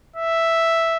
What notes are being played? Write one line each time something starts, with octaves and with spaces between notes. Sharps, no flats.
E5